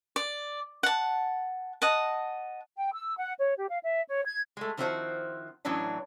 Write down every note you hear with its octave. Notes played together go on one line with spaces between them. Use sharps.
D5
F#5 A5
D#5 F#5 A5
G5
E6
F#5
C#5
G4
F5
E5
C#5
G#6
G#3 A3
D#3 F3 C4 E4 F#4 C5
A2 E3 F#3 C#4 D4